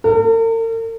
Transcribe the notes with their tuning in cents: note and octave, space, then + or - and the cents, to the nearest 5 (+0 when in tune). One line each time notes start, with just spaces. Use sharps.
A#4 -45